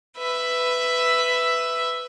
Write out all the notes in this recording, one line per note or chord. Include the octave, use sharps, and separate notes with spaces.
B4 E5